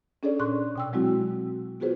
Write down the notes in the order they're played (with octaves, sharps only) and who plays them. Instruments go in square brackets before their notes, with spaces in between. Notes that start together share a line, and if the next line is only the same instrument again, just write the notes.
[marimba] C#4 D4 G#4 A4 C#5 D5
A#2 C6 C#6 F#6
B2 G5 E6
F#3 G#3 C4 E4 F#4
B3 F4 F#4 G#4 B4 C5